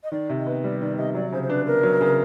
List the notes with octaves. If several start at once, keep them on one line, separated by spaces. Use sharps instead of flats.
D#5
D#3 D5
C3
D#5
B3
G3 D5
D#3 D5
C3 D#5
F#3 D5
C#3 C5
C5
D4 B4
B3 A#4
F#3
C#3